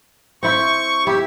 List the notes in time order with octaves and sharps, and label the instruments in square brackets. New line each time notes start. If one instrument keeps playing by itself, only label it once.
[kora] C4 E4 [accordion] C#6
[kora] E4 [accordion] G4